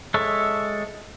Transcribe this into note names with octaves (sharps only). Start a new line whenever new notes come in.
G#3 A4 C#5 E5